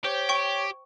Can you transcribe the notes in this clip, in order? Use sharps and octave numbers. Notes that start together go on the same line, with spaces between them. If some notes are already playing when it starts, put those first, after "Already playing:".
G4 C5 C#5
G5 C#6